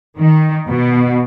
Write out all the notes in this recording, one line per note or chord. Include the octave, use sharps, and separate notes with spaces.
D#3
B2